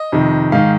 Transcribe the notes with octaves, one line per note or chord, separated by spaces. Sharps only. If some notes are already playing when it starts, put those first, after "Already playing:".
Already playing: D#5
F2 C3 D#3
G#2 D#3 F5